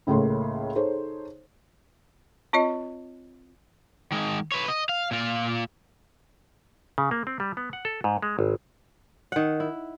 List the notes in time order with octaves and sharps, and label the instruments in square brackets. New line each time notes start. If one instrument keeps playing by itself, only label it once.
[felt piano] C#2 A2 C#3 A3 A#3 C6
D#4 G#4 A4 C5 C#5
[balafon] C4 F4 C#5 D#5
[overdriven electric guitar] D#3 G#3
B4 C#5
D#5
F5
A#2 F4
[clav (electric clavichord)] C#3
A#3
C4
G3
B3
F#5
A4
G#2
G#3
G#1
[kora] D#3 F#5
E4